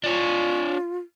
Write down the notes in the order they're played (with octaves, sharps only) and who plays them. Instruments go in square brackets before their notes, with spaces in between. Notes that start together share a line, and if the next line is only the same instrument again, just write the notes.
[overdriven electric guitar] D4 C#5 [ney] F4